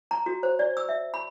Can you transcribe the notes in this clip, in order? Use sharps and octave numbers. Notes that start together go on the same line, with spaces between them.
A#5
F#4
C5
D5
E6
E5
B5